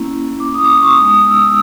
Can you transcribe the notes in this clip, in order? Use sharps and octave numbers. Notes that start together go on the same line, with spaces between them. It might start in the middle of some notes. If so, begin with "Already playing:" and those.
Already playing: A#3 C#4 E4
D6
D#6
D6
D#6
C#6
G#3 B3 D#4 D#6
E6
E6